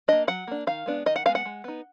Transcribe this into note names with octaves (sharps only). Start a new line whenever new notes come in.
A#3 D4 D#5
F#3 F#5
A#3 D4
D#3 F5
G#3 B3 D4
D#3 D#5
F#5
G#3 B3 D4 F5
F#5
G#3
B3 D#4